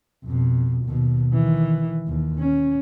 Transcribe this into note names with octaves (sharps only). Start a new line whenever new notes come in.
F2 B2
D#2 B2
D#3 E3
D#2
C#4